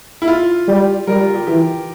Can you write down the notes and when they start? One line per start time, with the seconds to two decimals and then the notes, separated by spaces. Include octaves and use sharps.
0.22 E4
0.28 F4
0.68 G3
1.07 G3 A#4
1.20 F4
1.34 G4
1.47 E3 G4